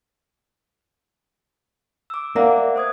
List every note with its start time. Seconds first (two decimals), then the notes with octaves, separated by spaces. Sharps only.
2.10 D6 E6
2.36 A#3 D5 E5 F#5
2.76 C5 D#6 G#6